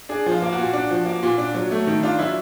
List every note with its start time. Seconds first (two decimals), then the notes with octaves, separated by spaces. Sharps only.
0.09 D4 G#4
0.26 F3 F4
0.42 A#3
0.52 F#4
0.58 A#2
0.73 D4
0.90 F3
1.06 A#3
1.23 A#2
1.38 D4
1.55 F#3
1.71 A3
1.87 D#3
2.03 D4 F4
2.19 F#3 E4